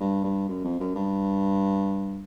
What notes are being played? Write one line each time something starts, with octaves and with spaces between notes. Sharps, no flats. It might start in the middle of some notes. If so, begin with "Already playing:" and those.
G2
G2
F#2
F2
F#2
G2